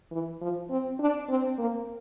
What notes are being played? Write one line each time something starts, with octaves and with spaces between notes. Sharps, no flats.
E3
F3
C4
D4
C4
A#3